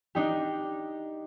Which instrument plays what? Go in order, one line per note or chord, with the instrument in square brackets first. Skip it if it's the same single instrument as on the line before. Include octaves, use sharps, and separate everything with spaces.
[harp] D4 D#4 G4